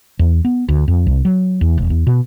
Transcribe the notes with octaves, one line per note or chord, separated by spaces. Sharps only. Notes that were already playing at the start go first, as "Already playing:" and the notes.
E2
B3
D2
F2
C2
F#3
E2
E1
E2
B2